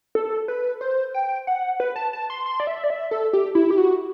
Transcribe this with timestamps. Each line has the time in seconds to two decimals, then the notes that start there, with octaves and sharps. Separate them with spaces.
0.15 A4
0.48 B4
0.81 C5
1.14 G5
1.47 F#5
1.80 B4
1.96 A5
2.13 A5
2.30 C6
2.46 C6
2.60 D5
2.67 E5
2.84 D5
2.90 E5
3.11 A4
3.33 G4
3.55 E4
3.71 G4
3.78 F#4